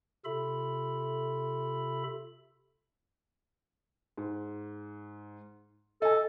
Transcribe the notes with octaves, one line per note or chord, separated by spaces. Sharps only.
C3 F4 A4 E5 B5
G#2
A4 D#5 G#5